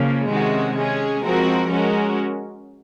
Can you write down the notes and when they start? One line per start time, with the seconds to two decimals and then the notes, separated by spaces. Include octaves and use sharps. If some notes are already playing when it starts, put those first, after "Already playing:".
Already playing: C#3 F3 A#3 C#4
0.30 C3 D#3 G#3 C#4 F#4
0.76 G#3 C#4 G#4
1.23 F3 G#3 C4 F#4 A#4
1.70 G#3 C#4 F#4 A#4